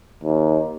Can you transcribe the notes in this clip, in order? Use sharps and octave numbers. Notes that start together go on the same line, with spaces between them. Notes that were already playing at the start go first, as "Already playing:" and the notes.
D#2